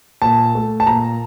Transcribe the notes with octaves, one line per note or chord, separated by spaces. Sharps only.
A#2 A5
A3
A5
A#2 A#5